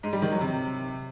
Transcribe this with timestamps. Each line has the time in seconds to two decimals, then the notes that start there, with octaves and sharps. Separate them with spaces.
0.03 G#2
0.13 G3
0.22 D#3
0.32 F#3
0.41 C3